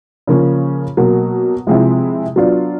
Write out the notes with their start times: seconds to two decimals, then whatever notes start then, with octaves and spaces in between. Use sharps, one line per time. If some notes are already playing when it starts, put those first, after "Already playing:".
0.27 C#3 F3 A#3 C#4
0.97 B2 F#3 A#3
1.67 C3 F3 G#3 C4 E4
2.36 F#3 B3 D4 F4